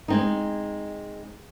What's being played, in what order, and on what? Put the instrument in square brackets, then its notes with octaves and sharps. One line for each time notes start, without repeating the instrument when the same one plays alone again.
[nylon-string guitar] G#3 C4 D#4